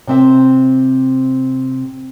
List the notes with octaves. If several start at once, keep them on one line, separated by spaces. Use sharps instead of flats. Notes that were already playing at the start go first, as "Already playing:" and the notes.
C3 C4 E5